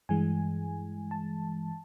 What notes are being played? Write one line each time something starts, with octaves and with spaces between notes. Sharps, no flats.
G2 E3 G#3 G#5
A5